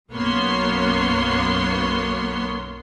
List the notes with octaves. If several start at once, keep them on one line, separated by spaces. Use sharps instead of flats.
B1 F#2 A#3 B3 C#5 C6